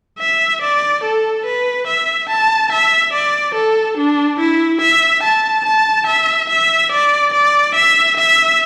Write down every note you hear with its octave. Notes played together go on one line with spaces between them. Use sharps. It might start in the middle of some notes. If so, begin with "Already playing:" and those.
E5
D5
A4
B4
E5
A5
E5
D5
A4
D4
E4
E5
A5
A5
E5
E5
D5
D5
E5
E5